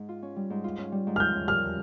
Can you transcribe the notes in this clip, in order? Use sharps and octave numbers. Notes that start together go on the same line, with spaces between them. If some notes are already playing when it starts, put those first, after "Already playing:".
Already playing: G#2
F4
C#4
G3
G#2
F4
C#4
G3
G#2
F6
F4 G6
C#4
G3 F6